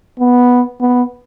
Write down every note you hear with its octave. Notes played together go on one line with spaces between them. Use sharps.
B3
B3